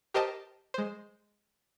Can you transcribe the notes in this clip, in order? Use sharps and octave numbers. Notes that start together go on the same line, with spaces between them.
G4 A#4 C5 D#5 G5 A5
G#3 C5